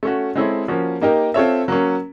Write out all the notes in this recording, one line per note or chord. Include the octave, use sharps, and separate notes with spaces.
A3 C#4 F#4
G#3 C4 E4 A4 C#5
F3 A#3 C#4 F#4
A#3 D#4 G4 A#4
C4 F4 A4 C#5 E5
F#3 A#3 C#4